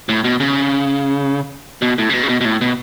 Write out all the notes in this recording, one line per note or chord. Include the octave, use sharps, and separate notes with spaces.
A2
B2
C#3
B2
A2
C#3
B2
C#3
B2
B2
A2
B2